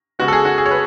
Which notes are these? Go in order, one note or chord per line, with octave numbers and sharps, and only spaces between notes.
C#3 G#3 B3 F#4
A4
G#4
F#4
G#4
C#5
B4